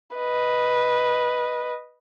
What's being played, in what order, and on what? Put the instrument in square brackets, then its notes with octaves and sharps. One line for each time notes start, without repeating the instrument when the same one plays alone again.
[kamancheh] B4 D#5